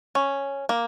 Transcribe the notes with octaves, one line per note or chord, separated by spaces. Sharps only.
C#4
A#3